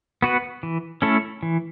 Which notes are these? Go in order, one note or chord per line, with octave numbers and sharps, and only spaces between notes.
B3 F#4 B4
E3
A3 C#4 E4 A4
E3